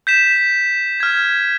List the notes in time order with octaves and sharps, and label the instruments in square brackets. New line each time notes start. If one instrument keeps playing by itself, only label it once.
[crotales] G6 B6 E7
F6 G#6